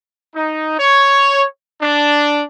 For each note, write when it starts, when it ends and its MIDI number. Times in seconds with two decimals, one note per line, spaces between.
0.35 0.77 63
0.79 1.44 73
1.82 2.43 62